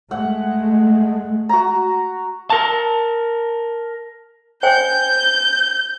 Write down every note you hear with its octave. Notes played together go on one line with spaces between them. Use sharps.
G#3 A3 F#5
F#4 A#5
A#4 A5
C5 G5 G#5 G6